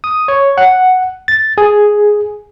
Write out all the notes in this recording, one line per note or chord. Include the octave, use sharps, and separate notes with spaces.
D#6
C#5
F#5
A6
G#4